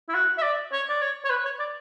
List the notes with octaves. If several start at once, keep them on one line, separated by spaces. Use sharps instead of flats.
E4
F#4
E5
D5
C#5
D5
C#5
C#5
B4
C#5
D5